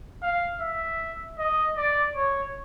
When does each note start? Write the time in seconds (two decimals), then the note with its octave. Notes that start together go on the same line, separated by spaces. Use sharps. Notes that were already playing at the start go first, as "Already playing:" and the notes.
0.22 F5
0.61 E5
1.38 D#5
1.77 D5
2.16 C#5